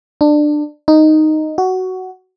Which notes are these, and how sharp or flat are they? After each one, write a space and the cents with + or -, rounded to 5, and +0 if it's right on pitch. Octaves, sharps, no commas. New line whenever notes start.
D4 +20
D#4 -5
F#4 +10